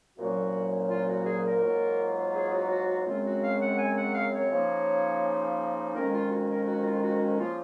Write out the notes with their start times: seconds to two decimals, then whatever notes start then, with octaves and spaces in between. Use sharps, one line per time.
0.17 C2 A#2 F#3 A#3 C#4 F#4
0.89 F4
1.07 F#4
1.25 G#4
1.43 A#4
1.61 G#2 F#3 A#3 F4
2.34 G#4
2.51 F#4
2.69 F#4
2.88 F#4
3.05 F#2 C#3 G#3 C4 F4
3.23 F#4
3.42 F5
3.60 F#5
3.77 G#5
3.96 F#5
4.13 F5
4.32 C#5
4.50 C#3 F3 A#3 D#4
5.94 F2 D#3 G#3 C#4 A#4
6.12 F4
6.30 F#4
6.49 A#4
6.66 F#4
6.84 F4
7.02 F#4
7.21 F#4
7.38 C#3 F3 A#3 F4